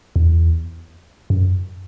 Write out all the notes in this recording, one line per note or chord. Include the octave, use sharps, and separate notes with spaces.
E2
F#2